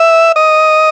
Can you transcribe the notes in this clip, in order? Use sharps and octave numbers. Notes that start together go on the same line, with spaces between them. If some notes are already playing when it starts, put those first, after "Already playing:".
Already playing: E5
D#5